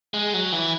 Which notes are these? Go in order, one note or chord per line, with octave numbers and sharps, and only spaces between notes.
G#3
F#3
E3